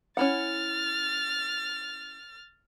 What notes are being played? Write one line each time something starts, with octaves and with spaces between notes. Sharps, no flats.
C#4 E4 F#5 F6 A6